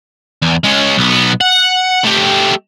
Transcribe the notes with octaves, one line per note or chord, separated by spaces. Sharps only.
E2
G#3 C#4
B1 B3
F#5
A3 G4